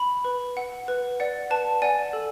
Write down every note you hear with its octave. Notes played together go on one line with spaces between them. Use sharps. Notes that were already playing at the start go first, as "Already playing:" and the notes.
Already playing: B5
B4
F#5
B4
D5 F#5
B4 A5
D5 F#5 G#5
A4